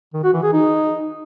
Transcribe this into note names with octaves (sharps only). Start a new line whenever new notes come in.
D#3
F#4
E3
G#4
D#4